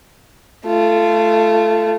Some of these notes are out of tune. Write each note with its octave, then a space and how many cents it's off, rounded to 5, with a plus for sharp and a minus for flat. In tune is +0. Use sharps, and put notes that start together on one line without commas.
A3 +0 F4 -25